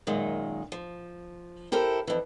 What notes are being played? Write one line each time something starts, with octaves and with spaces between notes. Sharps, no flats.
F#2 A#2 D#3 G#3
F3
E4 G4 A4 A#4 C5
F2 E3